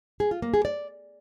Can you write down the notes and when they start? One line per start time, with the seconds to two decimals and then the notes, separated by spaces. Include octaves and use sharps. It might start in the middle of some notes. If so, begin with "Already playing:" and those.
0.20 G#4
0.31 F4
0.42 A#3
0.54 G#4
0.65 D5